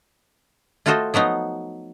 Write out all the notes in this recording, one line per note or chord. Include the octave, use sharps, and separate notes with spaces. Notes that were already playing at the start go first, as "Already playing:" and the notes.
A3 F4 F#4 A4 C5 D#5
F3 F#3 B3 D#4